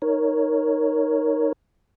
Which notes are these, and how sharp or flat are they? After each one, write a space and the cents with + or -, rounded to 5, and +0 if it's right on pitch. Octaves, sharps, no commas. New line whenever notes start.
D#4 +0 A#4 +0 C#5 +0